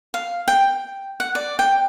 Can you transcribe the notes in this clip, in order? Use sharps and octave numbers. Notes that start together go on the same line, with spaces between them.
F5
G5
F#5
D5
G5